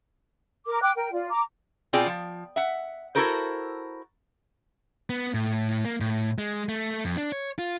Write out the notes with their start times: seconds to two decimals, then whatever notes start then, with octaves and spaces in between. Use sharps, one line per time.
0.66 A#4 D6
0.81 G5 D6 F#6
0.95 A#4 G5
1.12 F4 D5
1.30 A#5 D6
1.93 B2 C4 F4 G#4 D5 G5
2.06 F3
2.56 E5 F#5
3.15 E4 F#4 A4 A#4 C5
5.10 B3
5.34 A2
5.85 A#3
6.00 A2
6.38 G#3
6.69 A3
7.05 F2
7.17 D4
7.32 C#5
7.59 F4